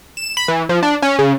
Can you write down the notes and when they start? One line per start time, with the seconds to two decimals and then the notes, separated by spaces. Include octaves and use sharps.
0.17 E7
0.37 B5
0.48 E3
0.69 F3
0.83 D4
1.02 C#4
1.19 C#3